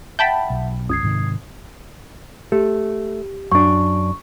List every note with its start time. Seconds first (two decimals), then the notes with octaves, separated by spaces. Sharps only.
0.19 E5 F#5 G5 A5 B5
0.50 B1
0.89 G1 C#2 D#6 G#6 C7
1.03 G#2 C3 D#3
2.52 A3 G4
3.52 F#2 D4 C#6